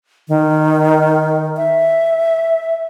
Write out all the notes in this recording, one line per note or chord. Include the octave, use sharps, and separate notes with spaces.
D#3
E5